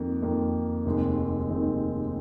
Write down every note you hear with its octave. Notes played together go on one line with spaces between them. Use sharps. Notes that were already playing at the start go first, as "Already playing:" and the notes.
Already playing: F2 D#3 A#3
F2 D#3 A#3
F1 D#2 D#3 G#3 C4
F1 D#2 D#3 G#3 C4